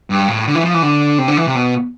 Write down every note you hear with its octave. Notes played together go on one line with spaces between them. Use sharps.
G2
A2
D3
E3
F3
E3
D3
C3
D3
E3
C3
B2